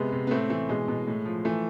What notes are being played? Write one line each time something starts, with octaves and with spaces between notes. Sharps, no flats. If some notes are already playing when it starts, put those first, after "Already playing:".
Already playing: C3 G#3 B3
C3
B3
A2 A3 C4
E3 A3
B2 G#3
B2
A2
F3
E3 A3